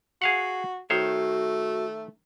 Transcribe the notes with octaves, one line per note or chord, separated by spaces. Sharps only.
F#4 G#4 F5 F#5
D#3 A3 F#4 C5 C#5